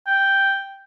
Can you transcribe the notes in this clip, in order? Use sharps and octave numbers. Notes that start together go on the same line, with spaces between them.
G5